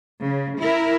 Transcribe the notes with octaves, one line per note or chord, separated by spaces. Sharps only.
C#3
E4 A#4